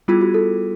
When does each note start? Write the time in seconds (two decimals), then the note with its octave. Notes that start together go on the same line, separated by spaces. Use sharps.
0.08 G3 B3 E4 F4 G#4
0.21 F#4
0.34 A4